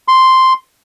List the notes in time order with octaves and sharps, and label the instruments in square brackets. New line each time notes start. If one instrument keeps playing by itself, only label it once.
[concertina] C6